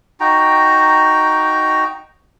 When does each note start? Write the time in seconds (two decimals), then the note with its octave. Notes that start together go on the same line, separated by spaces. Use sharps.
0.20 D#4 F#4 G5 A#5